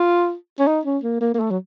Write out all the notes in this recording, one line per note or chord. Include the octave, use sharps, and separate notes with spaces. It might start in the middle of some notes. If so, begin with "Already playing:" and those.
Already playing: F4
C#4
D#4
C#4
A#3
A#3
A#3
A3
F#3